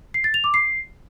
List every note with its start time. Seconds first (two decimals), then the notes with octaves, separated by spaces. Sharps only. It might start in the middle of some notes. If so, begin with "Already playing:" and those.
0.14 C7
0.24 A6
0.34 F7
0.44 D6
0.54 C7